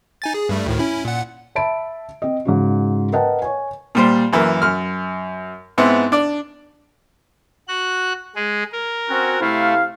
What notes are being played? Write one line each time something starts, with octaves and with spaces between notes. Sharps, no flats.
D#4 G#5 A6
G#4
G2 G3 A3
D2 A2 D#3
C#4 E4
A#2 F#5
E5 A5 B5 D7
C4 D#5
G#2 C#3 F#4
A#4 B4 D#5 F#5 G5 A5
C#5 G#5
A#2 G3 C5
F#2 E3 A#3
F#2 F6
G#2 B3 C4 E4
D4 D5
F#4 F#6
G#3 G#4
A#4
C4 C#4 F#4
C3 A3 E4 F5